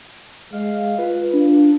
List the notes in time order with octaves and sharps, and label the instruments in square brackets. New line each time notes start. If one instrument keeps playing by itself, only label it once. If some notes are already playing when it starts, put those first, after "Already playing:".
[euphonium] G#3 [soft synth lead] F5
[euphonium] F4 [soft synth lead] B4
[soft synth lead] D4